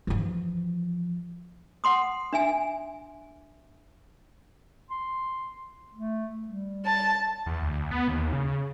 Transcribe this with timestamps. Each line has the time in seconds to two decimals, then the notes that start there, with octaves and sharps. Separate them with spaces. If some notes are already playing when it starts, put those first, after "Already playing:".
0.07 E3 F3
1.84 F#5 C6 D#6
2.33 D4 E5 G#5
4.90 C6
5.95 A3
6.48 G3
6.86 A5
7.46 E2
7.62 D2
7.91 B3
8.08 D#2
8.33 C#3